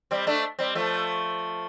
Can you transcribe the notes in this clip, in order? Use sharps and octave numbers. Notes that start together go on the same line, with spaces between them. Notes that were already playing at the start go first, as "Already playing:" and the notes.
G3 C4
A3 D4
G3 C4
F3 A3